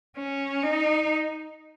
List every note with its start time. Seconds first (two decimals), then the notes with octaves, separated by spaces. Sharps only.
0.18 C#4
0.63 D#4